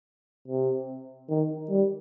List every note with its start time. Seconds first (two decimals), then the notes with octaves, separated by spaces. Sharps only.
0.48 C3
1.29 D#3
1.69 G3